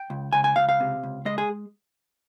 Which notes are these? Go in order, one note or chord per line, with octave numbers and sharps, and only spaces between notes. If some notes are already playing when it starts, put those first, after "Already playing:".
Already playing: G5
C#2
C#2 G#5
G#5
C#2 F5
F5
C3
C#2
G#3 D#5
G#4